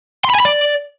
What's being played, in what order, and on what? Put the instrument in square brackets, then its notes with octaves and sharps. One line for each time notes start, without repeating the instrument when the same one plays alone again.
[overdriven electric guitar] C6
B5
G#5
B5
D5